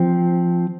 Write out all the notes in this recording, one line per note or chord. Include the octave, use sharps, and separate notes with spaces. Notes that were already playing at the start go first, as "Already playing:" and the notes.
Already playing: F3 C4